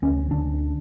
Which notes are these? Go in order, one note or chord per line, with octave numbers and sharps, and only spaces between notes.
D2 C#4
D2 D4